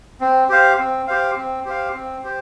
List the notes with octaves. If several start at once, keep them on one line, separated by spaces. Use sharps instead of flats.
C4
G4 C5 F5
C4
G4 C5 F5
C4
G4 C5 F5
C4
G4 C5